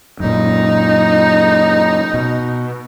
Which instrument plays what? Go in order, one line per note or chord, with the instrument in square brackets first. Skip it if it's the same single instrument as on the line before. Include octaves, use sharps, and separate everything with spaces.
[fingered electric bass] F#2 A#2 [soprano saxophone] D#4
[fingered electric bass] B2